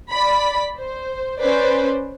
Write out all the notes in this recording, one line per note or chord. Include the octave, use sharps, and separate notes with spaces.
D5 B5
C5
C#4 B4 C5 D5